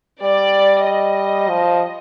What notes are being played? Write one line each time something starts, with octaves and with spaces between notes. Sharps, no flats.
G3 D5
D#5
F3